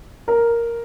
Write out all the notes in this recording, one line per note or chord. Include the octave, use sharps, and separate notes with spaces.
A#4